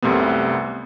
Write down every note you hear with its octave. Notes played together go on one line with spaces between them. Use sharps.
C2 F#2 C3 A3 B3